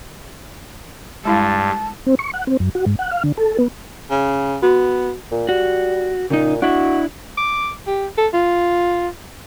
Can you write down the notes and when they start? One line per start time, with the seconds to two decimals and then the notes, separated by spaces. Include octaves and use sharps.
1.25 G2 G#3 E4 F5 A5
2.07 C4
2.19 C#6
2.34 F#5
2.47 C4
2.60 F#2
2.75 F#4
2.86 G#2
2.99 F#5
3.11 F5
3.24 D3
3.37 A4
3.58 B3
4.10 C#3
4.62 B3 F#4
5.32 A#2
5.49 G3 F#4
6.30 A#2 C#3 D#4
6.62 D4 E4 F#4
7.37 D6
7.87 G4
8.17 A4
8.33 F4